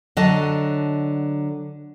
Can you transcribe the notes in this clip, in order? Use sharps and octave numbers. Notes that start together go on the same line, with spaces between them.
D3 F#3 D#5 A5